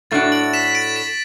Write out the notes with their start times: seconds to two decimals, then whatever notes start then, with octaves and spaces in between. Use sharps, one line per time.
0.11 A2 A3 D4 F#4 A6
0.32 D7 F#7
0.53 B6 E7
0.64 B6
0.75 A6 D7
0.96 B6 E7